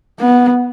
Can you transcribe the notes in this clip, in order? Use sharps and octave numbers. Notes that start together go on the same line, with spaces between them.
B3